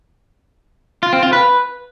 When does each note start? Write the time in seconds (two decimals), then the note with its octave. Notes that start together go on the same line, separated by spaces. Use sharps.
1.03 F4
1.13 C4
1.23 F4
1.33 B4